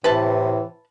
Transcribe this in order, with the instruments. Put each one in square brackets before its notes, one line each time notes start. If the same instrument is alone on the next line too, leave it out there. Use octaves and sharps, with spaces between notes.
[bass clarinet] A2 [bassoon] C3 [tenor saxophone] E3 [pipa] B4 A5